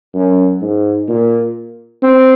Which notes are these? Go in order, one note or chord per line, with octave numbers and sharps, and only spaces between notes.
F#2
G#2
A#2
C4